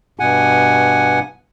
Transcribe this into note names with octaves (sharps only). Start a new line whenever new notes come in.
G2 B2 F#5 G#5